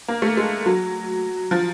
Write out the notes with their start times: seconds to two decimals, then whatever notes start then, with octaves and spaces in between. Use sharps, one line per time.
0.08 A#3
0.22 A3
0.37 G#3
0.66 F#3
1.51 F3